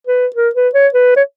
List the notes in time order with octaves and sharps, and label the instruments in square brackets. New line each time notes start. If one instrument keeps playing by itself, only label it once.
[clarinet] B4
A#4
B4
C#5
B4
C#5